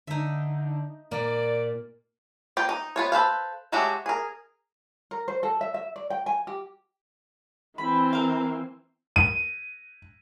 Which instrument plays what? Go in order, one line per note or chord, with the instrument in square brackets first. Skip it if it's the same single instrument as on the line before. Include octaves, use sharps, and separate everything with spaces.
[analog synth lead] D3 [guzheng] D#4 E5
[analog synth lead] A#2 [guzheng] A#3 [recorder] D5
[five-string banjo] A#3 F4 G5
D#4
B3 F4 C#5
A4 B4 C5 F5
F#3 G#3 A3 F#4 G4
G#4 A#4
[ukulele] A#4
C5
A4
E5
E5
D5
G5
G#5
G4
[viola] E3 C4 [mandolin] B5
[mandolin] A#4 F5
[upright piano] D#7